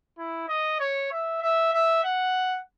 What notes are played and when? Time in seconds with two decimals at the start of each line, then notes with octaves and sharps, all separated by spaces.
0.18 E4
0.48 D#5
0.80 C#5
1.11 E5
1.42 E5
1.73 E5
2.04 F#5